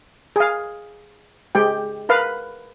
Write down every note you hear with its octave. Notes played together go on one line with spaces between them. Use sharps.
G#4 F5
G#3 G4 G5
A#4 B4 F5